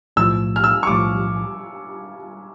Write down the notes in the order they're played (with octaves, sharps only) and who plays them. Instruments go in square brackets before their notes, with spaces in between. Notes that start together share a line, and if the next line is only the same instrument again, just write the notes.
[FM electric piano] B1 A2 F3 [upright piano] E6
[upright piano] F6
E6
C#6
[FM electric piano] B1 A2 F3 [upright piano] D6